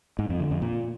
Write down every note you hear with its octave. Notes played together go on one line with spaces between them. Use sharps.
G#2
F2
D3
F2
A#2